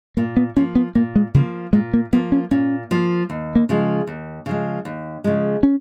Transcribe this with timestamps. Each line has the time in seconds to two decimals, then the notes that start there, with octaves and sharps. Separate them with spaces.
0.17 A#2 A#3
0.37 B3
0.56 F3 A#3 C#4
0.75 B3
0.95 A#2 A#3
1.16 G#3
1.34 C#3 F3 A#3
1.73 A#2 G#3
1.94 A#3
2.13 F3 A#3 B3
2.32 C#4
2.51 A#2 C#4
2.91 F3 A#3
3.30 D#2
3.56 A#3
3.69 C#3 F3 G#3
4.07 D#2
4.46 C#3 F3 G#3
4.85 D#2
5.24 C#3 F3 G#3
5.63 C#4